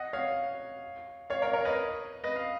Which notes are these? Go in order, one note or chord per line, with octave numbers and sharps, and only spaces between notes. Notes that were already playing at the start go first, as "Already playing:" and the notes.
Already playing: D#5 F#5
C#5 F5
C#5 F5
A#4 C#5
A#4 C#5
B4 D#5
B4 D#5
F5